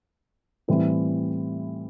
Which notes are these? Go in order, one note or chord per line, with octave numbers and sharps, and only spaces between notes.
A2 E3 G3 C4 E4